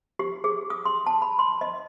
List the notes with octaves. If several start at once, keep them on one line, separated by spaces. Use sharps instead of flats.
G4
G#4
D#6
C6
A5
B5
C6
D#5